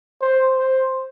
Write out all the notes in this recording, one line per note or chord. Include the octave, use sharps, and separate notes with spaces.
C5
C5